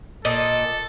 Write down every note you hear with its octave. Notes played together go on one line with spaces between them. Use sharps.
A#2 A4 D#5